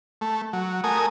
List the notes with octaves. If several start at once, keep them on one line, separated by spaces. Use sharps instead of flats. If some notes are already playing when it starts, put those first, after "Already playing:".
A3
F#3
A3 A#4 G#5 D#6